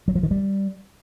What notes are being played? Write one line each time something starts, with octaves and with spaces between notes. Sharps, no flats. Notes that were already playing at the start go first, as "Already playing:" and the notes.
F#3
F3
D#3
G3